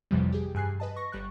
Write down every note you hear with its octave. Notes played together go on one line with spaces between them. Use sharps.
A1 F2 C3 E3 F3 G3
G4 G#4
G2 G#5 F#6 C7
B4 D#5 A5
C#6 A#6
G1 G3 C#6 F#6